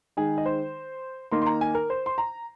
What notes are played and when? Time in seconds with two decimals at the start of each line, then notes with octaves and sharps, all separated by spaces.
0.17 D#3 G#3 D#4 G#4
0.38 D#5
0.46 C5
1.32 D#3 A#3 D#4 C6
1.42 C6
1.46 A#5
1.61 G#5
1.75 A#4
1.90 C5
2.06 C6
2.18 A#5